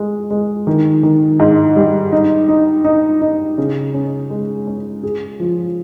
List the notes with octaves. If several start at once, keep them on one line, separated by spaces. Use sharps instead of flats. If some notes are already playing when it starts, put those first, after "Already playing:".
Already playing: G#3
G#3
D#3
D#3
G#2
G3
D#4
D#4
D#4
D#4
C#3
C#4
G#3
C#4
G#4
F3